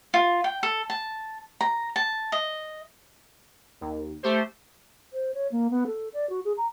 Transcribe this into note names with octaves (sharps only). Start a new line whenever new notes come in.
F4
G5
A4
A5
A#5
A5
D#5
D#2
A3 G4 C5
C5
C#5
A#3
B3
A4
D5
F#4
G#4
A#5